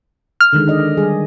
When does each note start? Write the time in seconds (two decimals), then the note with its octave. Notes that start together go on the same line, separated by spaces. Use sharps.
0.40 F6
0.53 D3 D#3 G#3
0.69 D5 D#5
0.97 G3 G#4